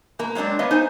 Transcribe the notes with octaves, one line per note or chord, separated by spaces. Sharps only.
B2 A#3 A#5
F#3 G#3 C4 D4 D5
A#3 B3 C#5 D#5
D#4 C5 G#5